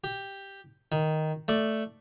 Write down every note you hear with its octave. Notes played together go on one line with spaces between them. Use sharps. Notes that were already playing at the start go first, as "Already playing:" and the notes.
G4
D#3
A3 D5 D6